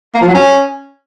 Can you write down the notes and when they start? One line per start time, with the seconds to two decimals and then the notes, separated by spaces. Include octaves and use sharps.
0.14 A#3
0.21 F3
0.28 F#3
0.35 C#4